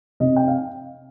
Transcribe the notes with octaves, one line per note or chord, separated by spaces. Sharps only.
C3 D#5
G5
F5